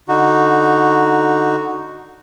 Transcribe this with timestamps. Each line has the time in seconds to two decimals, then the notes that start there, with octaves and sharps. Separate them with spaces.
0.08 D3 D#4 F#4